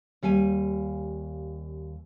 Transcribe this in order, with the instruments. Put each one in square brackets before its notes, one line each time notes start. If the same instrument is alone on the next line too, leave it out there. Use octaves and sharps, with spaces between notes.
[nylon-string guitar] D#2 G3 F5 G#5